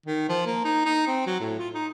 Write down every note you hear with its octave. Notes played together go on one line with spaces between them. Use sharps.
D#3
F3
A#3
D#4
D#4
C4
F#3
A2
F4
D#4